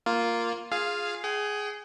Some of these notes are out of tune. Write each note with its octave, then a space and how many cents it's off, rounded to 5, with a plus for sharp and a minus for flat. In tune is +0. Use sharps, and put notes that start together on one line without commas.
A#3 +0 F4 +0
F4 +10 G#4 +0 F5 -5
G#4 +5 G5 -45